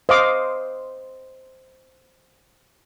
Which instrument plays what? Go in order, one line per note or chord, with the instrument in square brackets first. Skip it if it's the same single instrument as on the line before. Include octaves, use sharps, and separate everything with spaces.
[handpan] C5 [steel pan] D#5 F5 D6